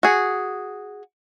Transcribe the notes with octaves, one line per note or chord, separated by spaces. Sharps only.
F#4 G#4